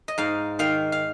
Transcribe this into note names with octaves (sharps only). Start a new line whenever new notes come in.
D#5
G#2 F5
D#3 F5
F5